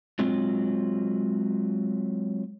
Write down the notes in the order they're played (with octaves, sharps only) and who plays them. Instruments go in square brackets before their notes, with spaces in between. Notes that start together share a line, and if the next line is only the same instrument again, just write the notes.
[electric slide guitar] F#3 G#3 C4 F4